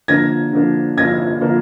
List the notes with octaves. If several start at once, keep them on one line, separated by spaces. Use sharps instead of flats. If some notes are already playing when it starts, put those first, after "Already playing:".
D3 F3 A#3 D4 G#6 A#6
D3 F3 A#3 D4
D3 F3 A#3 D4 G#6 A#6
D3 F3 A#3 D4